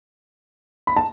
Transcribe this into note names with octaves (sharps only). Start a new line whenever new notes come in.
B5
A5